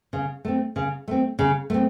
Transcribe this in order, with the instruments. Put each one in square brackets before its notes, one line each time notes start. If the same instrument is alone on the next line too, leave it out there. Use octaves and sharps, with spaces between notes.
[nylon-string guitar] C#3
A3 C4
C#3
A3 C4
C#3
A3 C4